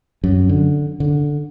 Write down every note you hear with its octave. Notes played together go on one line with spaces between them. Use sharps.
F#2
D3
D3